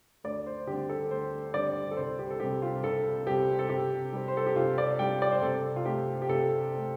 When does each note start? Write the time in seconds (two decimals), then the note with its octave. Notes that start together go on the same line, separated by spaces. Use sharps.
0.24 D2 D5
0.46 C5
0.67 D3 G3 C4 G4
0.89 A4
1.10 D2 C5
1.54 D3 G3 C4 D5
1.91 A4
1.97 C2 C5
2.19 G4
2.30 A4
2.40 C3 G3 C4 G4
2.62 F4
2.83 C2 A4
3.27 C3 G3 C4 G4
3.59 A4
3.69 C3 G4
4.13 G3 C4
4.28 C5
4.37 A4
4.46 G4
4.56 C3 F4
4.78 D5
4.99 G3 C4 G5
5.22 D5
5.32 C5
5.42 C3 A4
5.76 F4
5.85 A3 C4 G4
6.22 G4
6.29 C3 A4
6.72 A3 C4